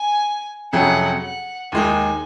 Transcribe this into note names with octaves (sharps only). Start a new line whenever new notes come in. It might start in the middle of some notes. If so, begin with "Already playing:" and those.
Already playing: G#5
F2 C3 F#3 C#4 G#4 F#5
F#5
D#2 D#3 G#3 D#4 G#5